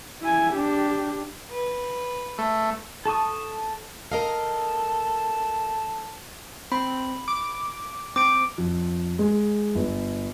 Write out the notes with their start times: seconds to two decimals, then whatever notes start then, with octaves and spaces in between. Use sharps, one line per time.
0.21 E4 G#5
0.53 D4 G4
1.51 B4
2.38 A3
3.06 A4 A5 C#6 D#6
4.12 A4 A#4 D#5 F5
6.72 C4 B5
7.28 D6
8.16 C4 D6 D7
8.58 F2
9.19 G#3
9.75 G1